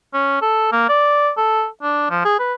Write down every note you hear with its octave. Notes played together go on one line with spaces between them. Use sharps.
C#4
A4
A#3
D5
A4
D4
F3
G#4
B4